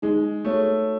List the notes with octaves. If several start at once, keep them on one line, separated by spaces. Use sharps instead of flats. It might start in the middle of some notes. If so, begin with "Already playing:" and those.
G#3 D#4
A3 F#4 C#5